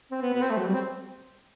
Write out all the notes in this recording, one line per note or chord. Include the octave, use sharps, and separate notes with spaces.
C4
B3
B3
C4
A3
F#3
G3
C4